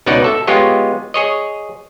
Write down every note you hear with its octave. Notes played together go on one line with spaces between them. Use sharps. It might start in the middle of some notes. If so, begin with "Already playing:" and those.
C#2 B2 D#4 C#5 D5 F#5
A4 E5
G#3 B3 F4 G4 C#5 D#5
G#4 C#5 D#5